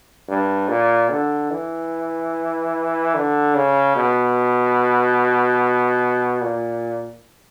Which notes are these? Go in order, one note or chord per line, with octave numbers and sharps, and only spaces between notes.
G2
A#2
D3
E3
D3
C#3
B2
A#2